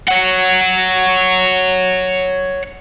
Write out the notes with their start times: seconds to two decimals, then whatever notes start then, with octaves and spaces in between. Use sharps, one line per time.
0.08 C#5 F#5